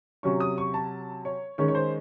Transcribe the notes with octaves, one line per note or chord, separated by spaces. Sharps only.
C3 F#3 C#4 C#6
D#6
C#6
A5
C#5
D#3 G#3 C#4 C#5
C#5
C5